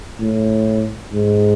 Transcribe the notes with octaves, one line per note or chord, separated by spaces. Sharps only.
A2
G#2